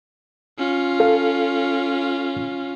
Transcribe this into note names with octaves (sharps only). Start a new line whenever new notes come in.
C#4 F4
A4 F5